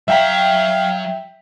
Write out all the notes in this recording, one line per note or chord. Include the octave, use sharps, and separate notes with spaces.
F#3 E5 F5 G5 A#5 B6